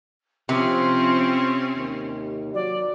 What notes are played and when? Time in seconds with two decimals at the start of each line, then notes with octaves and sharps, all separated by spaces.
0.49 C3 F3 C4 C#4 C6
1.76 D#2
2.54 F#3 D5